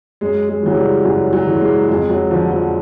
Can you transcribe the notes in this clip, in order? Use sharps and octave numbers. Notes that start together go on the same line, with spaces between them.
F#2 G#3
G#3
C#3 E3 F#3
G3
F#2 F#3
F#3
C#3 E3
G#3
F2 G#3
F#3
D3 F3
F3